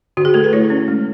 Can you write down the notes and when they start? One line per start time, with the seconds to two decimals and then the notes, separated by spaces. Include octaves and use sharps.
0.17 D3 F#4
0.25 G#4
0.34 A3 A4
0.44 B4
0.53 E4 C#5
0.70 C#4
0.88 G#3